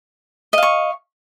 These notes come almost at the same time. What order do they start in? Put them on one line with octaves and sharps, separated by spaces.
D#5 F5 C#6